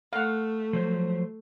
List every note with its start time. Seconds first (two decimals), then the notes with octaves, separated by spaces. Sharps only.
0.13 A3 F5 F#5
0.73 F3 F#3 C5